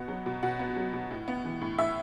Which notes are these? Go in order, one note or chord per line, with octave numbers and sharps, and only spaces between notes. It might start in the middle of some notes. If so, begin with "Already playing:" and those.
Already playing: B2 B3 F#5
F#3
B2
B2 F#5
B3
F#3
B2
A2
B3
E3
A2
A2 E5